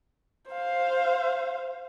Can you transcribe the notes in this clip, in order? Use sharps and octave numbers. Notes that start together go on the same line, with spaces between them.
C5 F5